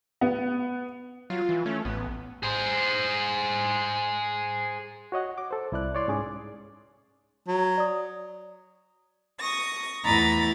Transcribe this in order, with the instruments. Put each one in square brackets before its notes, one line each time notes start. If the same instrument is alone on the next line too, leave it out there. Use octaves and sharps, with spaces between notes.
[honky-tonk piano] B3
[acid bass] F#3 [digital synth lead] F4
[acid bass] E3
[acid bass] A3 [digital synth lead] C#4
[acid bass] A1 [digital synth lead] B3
[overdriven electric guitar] G#4 C5
[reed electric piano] F#4 C#5 D#5 F#5
D6
A4 C5
C2 E4 D5 F#6
C#5 D5 C6
G#2 C#4 G#4 D6
[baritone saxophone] F#3
[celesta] D5 D#6
[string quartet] C#6 D#6 A#6
E2 A3 E4 A#5 B5 A6